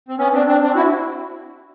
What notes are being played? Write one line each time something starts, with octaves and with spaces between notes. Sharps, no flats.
C4
B3 C#4
C4 D4
C4 D4
C4 D4
E4 F#4